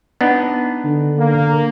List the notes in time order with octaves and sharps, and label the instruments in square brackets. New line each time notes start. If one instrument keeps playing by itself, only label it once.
[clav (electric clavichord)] B3 D4 D#4
[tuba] D3
[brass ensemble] A#3